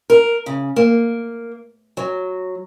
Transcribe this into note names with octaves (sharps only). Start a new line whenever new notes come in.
A#4
C#3
A#3
F#3